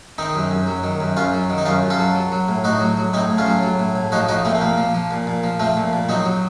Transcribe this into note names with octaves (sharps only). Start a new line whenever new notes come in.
D#3 C4 D#4
F#2
F#2
F#3
D#3
F#2
F#2 C#4 F4
F#3
D#3
D#4
F#2 C#4 F4
F#2
F4 A4
F#3
F#3
F#3
A2
A2 D#4 F#4
F#3
F#3
A2 C4 D#4
A2
C#4 F4
F#3
F#3
A2
A2
F3 D#4 F#4
F3 D#4 F#4
A#2 A3 C4
C4
A#2 A#3
F3
F3
A#2
A#2
F3
F3 A3 C4
A#2
A#2
F#3 C4 D#4
F#3